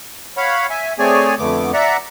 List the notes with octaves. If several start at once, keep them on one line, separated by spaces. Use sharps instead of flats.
C#5 F5 F#5 B5
E5 G#5
A3 C4 G#4 C#5 D5 G#5
F2 D3 A3 B3 D6
D5 E5 F#5 A#5